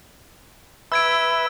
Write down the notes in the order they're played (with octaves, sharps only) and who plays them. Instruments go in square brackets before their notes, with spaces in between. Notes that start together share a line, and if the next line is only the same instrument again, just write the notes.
[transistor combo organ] B4 E5 [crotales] E6 G#6 D7